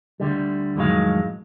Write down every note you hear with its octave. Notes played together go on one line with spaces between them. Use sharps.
D2 D3 G3
F2 A2 D#3 F#3 G#3 F5